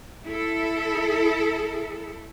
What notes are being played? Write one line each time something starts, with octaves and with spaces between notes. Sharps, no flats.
E4 A4